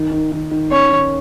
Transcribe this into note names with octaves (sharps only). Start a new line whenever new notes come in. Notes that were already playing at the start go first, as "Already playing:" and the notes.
Already playing: D#3
D#3
D#3
D#3
C#4 C#5
D#3